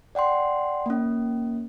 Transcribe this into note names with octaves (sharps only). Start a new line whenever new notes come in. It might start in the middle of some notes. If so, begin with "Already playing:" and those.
D5 F#5 G5 C6
A#3 C#4